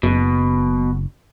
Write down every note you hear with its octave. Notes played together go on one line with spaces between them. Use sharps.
F#1 B2